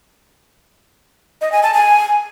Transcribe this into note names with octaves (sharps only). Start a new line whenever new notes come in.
D#5
G#5
A5
G#5